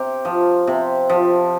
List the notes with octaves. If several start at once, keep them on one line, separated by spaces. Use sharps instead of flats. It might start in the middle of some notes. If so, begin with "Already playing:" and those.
Already playing: C3 G4
F3
C3
F3